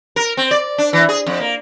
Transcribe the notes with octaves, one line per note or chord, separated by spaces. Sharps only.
A#4
C4
D5
D4
E3
G#4
F2
A#3